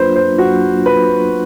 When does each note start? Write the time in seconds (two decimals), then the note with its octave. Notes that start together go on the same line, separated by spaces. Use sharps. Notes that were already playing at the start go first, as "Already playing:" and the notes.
Already playing: F#3 A#3 D4 F4 B4 C5
0.16 C5
0.38 F#3 A#3 D4 F4 F#4
0.86 B4